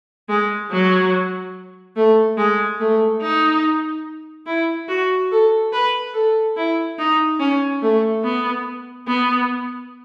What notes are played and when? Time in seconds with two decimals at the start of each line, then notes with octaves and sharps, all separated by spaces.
0.29 G#3
0.71 F#3
1.96 A3
2.37 G#3
2.80 A3
3.22 D#4
4.46 E4
4.88 F#4
5.31 A4
5.72 B4
6.14 A4
6.57 E4
6.98 D#4
7.40 C#4
7.82 A3
8.23 B3
9.07 B3